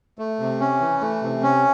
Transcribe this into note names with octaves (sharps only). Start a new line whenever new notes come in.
A3
C3
C#4
E3
A3
C3
C#4